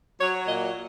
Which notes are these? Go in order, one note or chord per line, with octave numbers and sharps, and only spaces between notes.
F#3 C#5
A#2 D#5